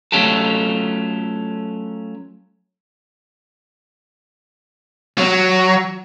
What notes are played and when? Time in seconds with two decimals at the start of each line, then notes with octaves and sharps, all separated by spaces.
0.12 F#3 A3 C#4 F4 G4 A4
5.18 F#3